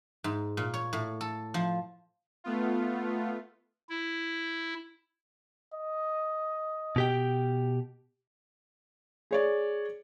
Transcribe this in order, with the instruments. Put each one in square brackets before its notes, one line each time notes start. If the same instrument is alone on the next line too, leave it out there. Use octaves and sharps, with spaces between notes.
[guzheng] G#2
A#2
C#5
A2
A4
F3
[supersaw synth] A3 B3 F4
[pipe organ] E4
[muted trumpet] D#5
[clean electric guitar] B2 G4 G5
[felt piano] G#4 C#5 D5